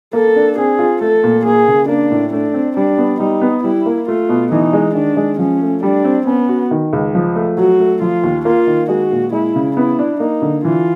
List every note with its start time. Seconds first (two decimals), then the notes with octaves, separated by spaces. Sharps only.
0.13 A#3 A4
0.36 D4
0.58 C4 G#4
0.79 F4
1.01 A3 A4
1.24 A#2
1.45 A#3 G#4
1.68 C#3
1.88 A#3 D4
2.11 A2
2.32 A3 D4
2.54 C4
2.77 G3 D4
2.98 B3
3.20 G3 D#4
3.42 B3
3.64 G3 E4
3.86 A#3
4.08 A3 F4
4.29 B2
4.52 E3 D#4
4.73 G#3
4.95 D#3 D4
5.17 G#3
5.39 F3 C#4
5.62 A3
5.83 G3 D4
6.05 C4
6.26 B3 C#4
6.49 F#4
6.71 D#3
6.93 C#2
7.15 F3
7.36 A3
7.57 F#3 F#4
7.79 A3
8.01 F3 F4
8.23 D#2
8.45 A#3 F4
8.67 D#3
8.89 G#3 F#4
9.12 A#2
9.32 G#3 E4
9.56 C#3
9.77 B3 E4
9.99 D4
10.20 A#3 D#4
10.42 D3
10.65 E3 F4